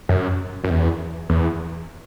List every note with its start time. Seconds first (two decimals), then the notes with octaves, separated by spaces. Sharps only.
0.09 F#2
0.64 F#2
0.70 E2
1.29 E2